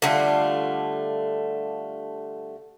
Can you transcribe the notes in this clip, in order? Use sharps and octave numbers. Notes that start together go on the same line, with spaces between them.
D3 G3 A3 F4